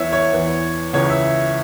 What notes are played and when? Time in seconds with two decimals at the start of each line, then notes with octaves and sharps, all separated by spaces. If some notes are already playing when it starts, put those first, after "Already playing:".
Already playing: E2 E3 C#5 E5
0.13 C#5
0.33 E2 E3
0.93 C#2 C#3 E3 C#5
1.09 E5